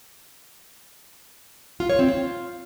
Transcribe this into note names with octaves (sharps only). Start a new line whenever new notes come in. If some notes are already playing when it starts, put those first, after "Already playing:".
F4
C#5
C4
F4